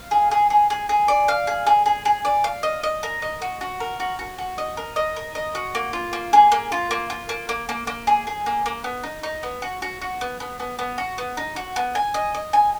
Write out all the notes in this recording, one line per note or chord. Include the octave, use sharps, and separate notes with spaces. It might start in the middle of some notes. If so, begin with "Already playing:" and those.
Already playing: F5
G#4
G#4
G#4
G#4
G#4
D5
F5
G#4
G#4
G#4
G#4
D5
F5
D#5
D#5
A#4
D#5
F#4
F#4
A#4
F#4
F#4
F#4
D#5
A#4
D#5
A#4
D#5
F#4
A#3
F4
A#3
G#4
A#3
F4
A#3
F4
A#3
A#3
A#3
A#3
G#4
G#4
A#3
A#3
B3
D#4
D#4
B3
F#4
F#4
F#4
B3
B3
B3
B3
F#4
B3
D#4
F#4
B3
G#5
D#5
D#5
G#5